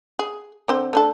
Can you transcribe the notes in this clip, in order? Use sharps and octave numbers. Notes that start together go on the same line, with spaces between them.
G#4
D3 C4 C5
A3 D4 A4